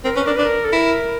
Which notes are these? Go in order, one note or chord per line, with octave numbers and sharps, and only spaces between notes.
C4 A#4
C#4 B4
D4 A#4
D4 B4
A#4
A4
E4 A#4